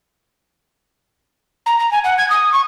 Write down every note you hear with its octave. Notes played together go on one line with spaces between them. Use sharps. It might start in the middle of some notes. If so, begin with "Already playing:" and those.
A#5
A#5
G#5
F#5
G#6
D#6
C#6